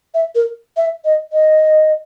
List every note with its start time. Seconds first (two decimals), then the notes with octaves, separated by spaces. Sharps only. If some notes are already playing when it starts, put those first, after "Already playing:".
0.14 E5
0.35 A#4
0.77 E5
1.05 D#5
1.33 D#5